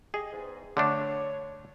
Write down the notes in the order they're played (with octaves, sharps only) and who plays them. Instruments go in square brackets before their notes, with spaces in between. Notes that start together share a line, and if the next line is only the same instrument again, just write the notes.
[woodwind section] G4 D#5 [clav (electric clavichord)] G#4
[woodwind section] E2 G#2
[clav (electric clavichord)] D3 A3 D4 [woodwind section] C#5